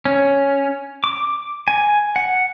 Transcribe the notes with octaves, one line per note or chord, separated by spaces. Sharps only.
C#4
D6
G#5
F#5